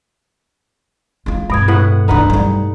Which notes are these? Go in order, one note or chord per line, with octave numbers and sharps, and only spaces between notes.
G#3 F4
G2 B2 C4 G#6
A2 B4 F#5
C2 D3 D#4 B4 F#5
F#3 G3